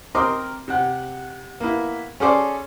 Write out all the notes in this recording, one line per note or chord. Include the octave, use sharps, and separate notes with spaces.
C4 A#4 D#5 C6 D6
C3 F#5
A#3 B3 E4
C#4 G#4 A4 C5 D5